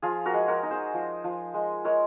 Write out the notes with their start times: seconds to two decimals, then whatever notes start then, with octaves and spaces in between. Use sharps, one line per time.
0.02 F3 F4 G#4
0.26 F#4 A#4
0.33 G#3
0.48 F#4 A#4
0.63 D#4
0.71 G#4 C5
0.94 F3
1.24 F3
1.54 G#3
1.85 G#3 A#4 C#5